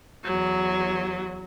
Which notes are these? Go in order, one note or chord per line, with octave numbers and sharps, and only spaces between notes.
E2 F#3